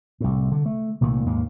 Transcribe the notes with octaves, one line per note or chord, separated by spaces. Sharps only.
C2 A2
D3
A3
C2 A#2 D#3 A3
D#2 G#2 G#3 A#3